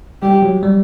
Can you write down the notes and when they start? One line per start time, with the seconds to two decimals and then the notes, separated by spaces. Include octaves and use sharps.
0.22 G3 G4
0.42 F#3
0.63 G3